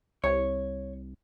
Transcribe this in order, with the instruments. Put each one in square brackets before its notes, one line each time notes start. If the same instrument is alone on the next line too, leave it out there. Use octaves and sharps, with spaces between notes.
[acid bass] C2 [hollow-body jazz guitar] C#5